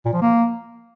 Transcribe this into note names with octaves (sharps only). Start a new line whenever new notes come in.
A#2
F3
A#3